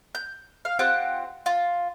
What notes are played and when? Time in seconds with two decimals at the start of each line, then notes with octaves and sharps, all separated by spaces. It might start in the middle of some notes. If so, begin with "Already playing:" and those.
0.15 G6
0.65 F5
0.79 C4 F4 G4 F#5
1.46 F4